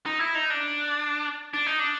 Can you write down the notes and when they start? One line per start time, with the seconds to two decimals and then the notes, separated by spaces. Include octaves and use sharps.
0.06 D#4
0.20 E4
0.35 D#4
0.50 D4
1.54 D4
1.66 D#4
1.79 D4